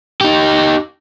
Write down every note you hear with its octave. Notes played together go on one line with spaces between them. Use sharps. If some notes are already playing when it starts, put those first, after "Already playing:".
D#4 G4